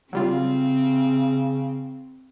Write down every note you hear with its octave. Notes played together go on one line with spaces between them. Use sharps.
C#3 F#3 G3 C4 F4